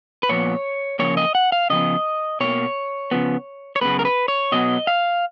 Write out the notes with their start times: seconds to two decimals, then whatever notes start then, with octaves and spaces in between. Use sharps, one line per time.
0.23 B4
0.29 A#2 F3 B3 C#5
0.99 C#3 F3 A#3 C#5
1.17 D#5
1.35 F#5
1.52 F5
1.70 C#3 F3 B3 D#5
2.40 B2 A#3 C#5
3.11 C#3 F3 B3
3.76 C#5
3.81 F#2 C#3 G#3 B3 B4
3.99 A#4
4.05 B4
4.28 C#5
4.52 B2 F#3 B3 D#5
4.87 F5